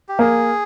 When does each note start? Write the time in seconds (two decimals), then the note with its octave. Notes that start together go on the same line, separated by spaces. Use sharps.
0.09 G4
0.19 A#3 G#4